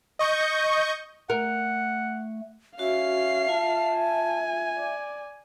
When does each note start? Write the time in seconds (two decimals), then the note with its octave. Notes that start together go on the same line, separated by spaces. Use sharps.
0.19 D#5 C#6 G6
1.30 A3 A#4 F#5
2.79 C#4 F#4 E5 F5 C7
3.49 F4 A5
3.98 G#5
4.78 D5